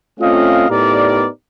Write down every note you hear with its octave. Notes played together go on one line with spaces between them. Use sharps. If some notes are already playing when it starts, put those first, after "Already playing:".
A3 C4 C#4 F4 D#5 F5
A2 B3 D#4 G4 A#4 D5